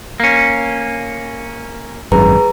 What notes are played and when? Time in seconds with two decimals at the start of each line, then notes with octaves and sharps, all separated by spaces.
0.20 A#3 C#4
2.12 G#1 F#2 G#4 B4 A#5